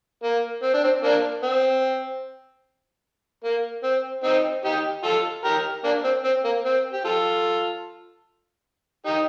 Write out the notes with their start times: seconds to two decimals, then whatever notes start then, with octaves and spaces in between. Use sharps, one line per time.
0.23 A#3
0.62 C4
0.74 D4
0.84 C4
1.03 A#3 D4
1.43 C4
3.44 A#3
3.83 C4
4.24 C4 D#4
4.65 D#4 G4
5.04 F4 A4
5.44 G4 A#4
5.84 A#3 D4
6.04 C4
6.25 C4
6.45 A#3
6.65 C4
6.93 G4
7.05 F4 A4
9.06 D#4 G4